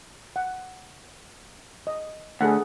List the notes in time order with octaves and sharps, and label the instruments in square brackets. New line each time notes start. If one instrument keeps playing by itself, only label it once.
[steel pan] F#5
D#5
[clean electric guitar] D2 [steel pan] G#4 A4 F#5